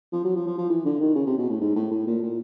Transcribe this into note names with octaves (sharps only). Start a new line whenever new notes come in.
F3
F#3
F3
F3
F3
E3
D3
D#3
C#3
C3
B2
A2
G#2
A2
A2
A#2
A#2